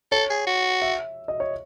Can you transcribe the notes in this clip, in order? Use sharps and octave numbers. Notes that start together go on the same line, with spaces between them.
A4 C#5
G#4
F#4
E5
D#5
C#5